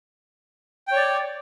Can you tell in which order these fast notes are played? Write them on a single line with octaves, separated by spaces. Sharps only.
G5 C#5 D5